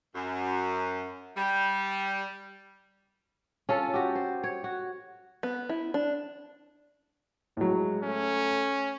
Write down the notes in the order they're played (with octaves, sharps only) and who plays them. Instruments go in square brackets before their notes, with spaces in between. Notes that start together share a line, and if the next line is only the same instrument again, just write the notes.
[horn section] F#2
G3
[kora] C#4 F4 A4
F#4 G4
C5
C#5
F#4
[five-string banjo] B3
E4
D4
[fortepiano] A2 F#3 [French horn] G#3
[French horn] A3 [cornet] C#4